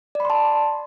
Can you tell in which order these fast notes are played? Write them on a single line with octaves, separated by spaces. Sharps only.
D5 B5 C6 A5